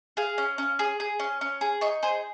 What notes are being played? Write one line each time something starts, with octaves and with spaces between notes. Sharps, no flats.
G#4 F5
C#4
C#4
G#4
G#4
C#4
C#4
G#4
D#4 C#5
G#4 C5